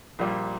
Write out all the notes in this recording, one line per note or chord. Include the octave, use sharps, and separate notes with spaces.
A#1 A#2 G3